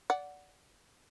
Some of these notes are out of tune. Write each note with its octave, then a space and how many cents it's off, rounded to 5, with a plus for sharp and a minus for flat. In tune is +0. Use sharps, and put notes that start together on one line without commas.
D5 -20 F#5 +0